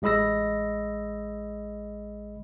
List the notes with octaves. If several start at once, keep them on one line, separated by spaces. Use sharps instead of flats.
A1 G#3 D#5 B5 E6 A#6